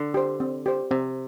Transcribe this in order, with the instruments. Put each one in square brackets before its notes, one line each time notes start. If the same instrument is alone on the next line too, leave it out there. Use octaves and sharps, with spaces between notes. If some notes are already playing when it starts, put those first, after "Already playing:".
Already playing: [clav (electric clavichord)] D3
[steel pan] G4 C5
C4
G4 C5
[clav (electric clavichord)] C3 [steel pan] C4